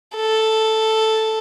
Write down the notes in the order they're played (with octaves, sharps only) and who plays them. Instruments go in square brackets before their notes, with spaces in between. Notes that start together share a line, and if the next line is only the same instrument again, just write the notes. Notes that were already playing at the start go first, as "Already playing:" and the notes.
[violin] A4